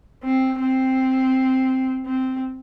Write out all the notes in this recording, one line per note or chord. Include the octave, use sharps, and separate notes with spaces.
C4
C4
C4